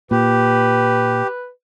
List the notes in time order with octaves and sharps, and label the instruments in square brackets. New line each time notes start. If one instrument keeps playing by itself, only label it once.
[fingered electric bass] A#2 [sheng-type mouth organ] G4 [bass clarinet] B4